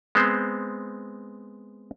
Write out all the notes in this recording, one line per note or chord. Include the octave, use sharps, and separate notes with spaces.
G#3 B3 C4 C5